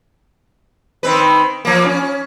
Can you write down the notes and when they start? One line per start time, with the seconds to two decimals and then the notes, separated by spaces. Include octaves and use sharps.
1.03 D#3 C4 B4
1.65 F3 A#3
1.85 C#4